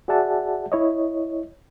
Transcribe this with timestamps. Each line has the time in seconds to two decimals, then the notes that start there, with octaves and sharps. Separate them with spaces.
0.08 F#4 G#4 D5 E5 F#5 A5
0.72 E4 C#5 D#5